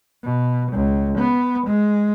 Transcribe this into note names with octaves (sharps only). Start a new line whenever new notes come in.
B2
C#2
B3
G#3